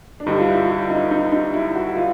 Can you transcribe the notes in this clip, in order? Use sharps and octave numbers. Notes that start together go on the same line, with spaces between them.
D4
G2 D3 G3 D#4
F4
E4
F4
D#4
D#4
D#4
E4
F#4
F4